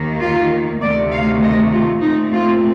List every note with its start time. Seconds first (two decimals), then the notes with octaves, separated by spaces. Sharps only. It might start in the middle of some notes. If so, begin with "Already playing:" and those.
Already playing: D#2 D#3 A#3
0.20 F4
0.81 D2 C3 D#3 A3 D5
1.12 F5
1.42 D#5
1.73 F4
2.02 A#2 A3 C4 D#4
2.33 F4